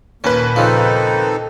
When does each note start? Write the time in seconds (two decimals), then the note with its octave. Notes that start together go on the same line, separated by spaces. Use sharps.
0.24 D#2 A#2 A#3 C#4 B4
0.56 C#3 F3 C4 D#4 A4